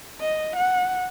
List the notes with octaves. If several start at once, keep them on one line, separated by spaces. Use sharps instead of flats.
D#5
F#5